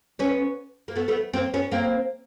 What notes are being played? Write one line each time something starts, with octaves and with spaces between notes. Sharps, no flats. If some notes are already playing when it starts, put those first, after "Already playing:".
B3 C#4
A#3
A3 B3
A3 B3
A#3 C4
B3 C#4
A#3 C4